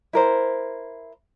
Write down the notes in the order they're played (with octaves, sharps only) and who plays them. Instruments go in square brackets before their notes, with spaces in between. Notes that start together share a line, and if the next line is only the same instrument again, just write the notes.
[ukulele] E4 A#4 C5